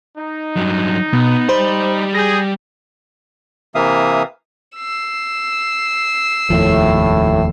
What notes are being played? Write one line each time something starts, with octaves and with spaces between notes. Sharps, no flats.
D#4
G2 F#3
B2 B3
G3 C5 B5
G#4 G6 A#6
C3 E3 A#3 E5 F5 D#6
E6 C7
F1 D#2 A2 F3